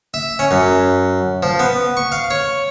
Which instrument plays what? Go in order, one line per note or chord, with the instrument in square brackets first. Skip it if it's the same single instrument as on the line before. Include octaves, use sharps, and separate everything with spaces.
[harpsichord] E5
C#4
F#2
F3
B3
C#6
F5
C#5